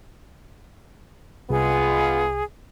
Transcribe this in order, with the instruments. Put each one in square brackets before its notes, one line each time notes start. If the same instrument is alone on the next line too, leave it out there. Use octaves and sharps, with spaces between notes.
[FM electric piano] C2 [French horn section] G#3 B3 F4 [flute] G#4